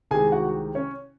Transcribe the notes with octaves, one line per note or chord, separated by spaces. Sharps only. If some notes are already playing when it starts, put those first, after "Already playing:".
C2 C3 D#3 G#3 G#4 G#5
F#4 F#5
C#4 C#5